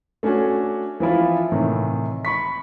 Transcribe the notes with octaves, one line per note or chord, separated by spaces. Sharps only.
A3 C#4 D4 F#4 G#5
E3 F3 E4 F4
A2 C3 D#3 E3
B5 C#6 B6